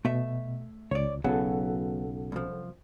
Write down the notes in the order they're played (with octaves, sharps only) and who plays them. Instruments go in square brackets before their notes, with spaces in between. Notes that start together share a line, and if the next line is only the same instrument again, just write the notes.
[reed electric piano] B2 [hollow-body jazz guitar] A3 E5
[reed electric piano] C#2 [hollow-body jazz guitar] C#5 D5
[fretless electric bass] B1 C#3 [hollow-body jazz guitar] F#3 B3 [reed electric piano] A4 F#5
[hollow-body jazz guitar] C2 F#2 F3